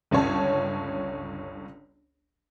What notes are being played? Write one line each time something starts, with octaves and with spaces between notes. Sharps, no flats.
G1 C#2 C#4 C#5 A5